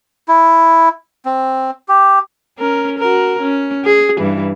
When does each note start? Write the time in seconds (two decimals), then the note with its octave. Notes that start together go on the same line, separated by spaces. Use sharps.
0.28 E4
1.25 C4
1.88 G4
2.59 C#4 A#4
2.99 F#4 A#4
3.41 C#4
3.85 G#4
4.17 G2 E3